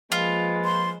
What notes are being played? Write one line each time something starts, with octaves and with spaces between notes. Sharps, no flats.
F3 G#3 A#3 F4 B4
C6